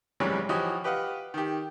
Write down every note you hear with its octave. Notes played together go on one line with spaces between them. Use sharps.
G#2 C3 E3 F#3 G3 C#4
E3 F3 F#4 G4 C#5 D#5
G4 B4 D#5 F5 F#5
D#3 G4